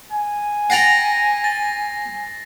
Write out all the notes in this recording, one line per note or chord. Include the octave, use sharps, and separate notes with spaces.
G#5
F#5 G5 A#5 A6 A#6 C7
A6